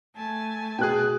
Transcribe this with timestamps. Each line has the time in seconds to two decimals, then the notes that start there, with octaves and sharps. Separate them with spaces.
0.15 A3 G#5 A5
0.79 B2 G#4 G5 F#6